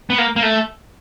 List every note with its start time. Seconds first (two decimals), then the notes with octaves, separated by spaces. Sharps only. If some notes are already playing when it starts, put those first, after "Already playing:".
0.10 B3
0.18 A#3
0.36 A#3
0.43 A3